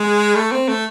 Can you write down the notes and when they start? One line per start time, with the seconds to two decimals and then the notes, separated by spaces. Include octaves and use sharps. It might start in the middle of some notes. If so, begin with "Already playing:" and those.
Already playing: G#3
0.35 A3
0.52 C4
0.68 A3